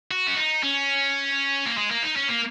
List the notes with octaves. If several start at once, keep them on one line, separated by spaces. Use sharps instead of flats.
F#4
C#4
D#4
C#4
A#3
G#3
A#3
D#4
C#4
A#3